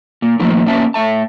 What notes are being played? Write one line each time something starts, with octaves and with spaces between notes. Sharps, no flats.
A#2
A#2 D#3 F3 A3 A#3
B2 A#3 C#4 E5 A5
A2 E5 A5